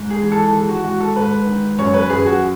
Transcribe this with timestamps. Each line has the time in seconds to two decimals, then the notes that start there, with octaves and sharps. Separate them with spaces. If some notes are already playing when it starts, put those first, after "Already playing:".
Already playing: G#2
0.10 G#4
0.22 E3
0.32 A4
0.52 D#3 G#4
0.68 F#4
0.83 G#2 F#4
1.00 A4
1.16 G#2 B4
1.46 D#3
1.78 F#2 C#5
1.94 B4
2.09 F#2 G#4
2.26 F#4